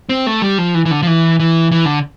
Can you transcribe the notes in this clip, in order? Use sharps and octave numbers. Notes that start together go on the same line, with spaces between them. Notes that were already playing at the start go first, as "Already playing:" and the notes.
C4
A3
G3
F3
E3
E3
D3
F3
E3
E3
E3
D3